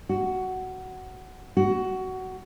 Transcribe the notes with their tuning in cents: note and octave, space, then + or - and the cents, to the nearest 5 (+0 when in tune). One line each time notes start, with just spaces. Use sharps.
F#4 +10
F#4 +15